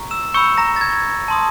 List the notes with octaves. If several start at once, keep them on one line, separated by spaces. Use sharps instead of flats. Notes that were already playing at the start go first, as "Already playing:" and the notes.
Already playing: A#5 C#6
E6 E7
B5 C#6 E6 G6 C#7
A#5 A#6
A6
G#6
A5 C6 D#6